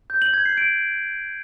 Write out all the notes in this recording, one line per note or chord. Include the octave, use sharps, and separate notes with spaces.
G6
F#7
G#6
C7
D7